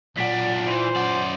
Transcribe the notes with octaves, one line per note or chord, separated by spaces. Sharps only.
B1 A#2 D4 F#5 B6
E3 C5
F#2 D5 F#5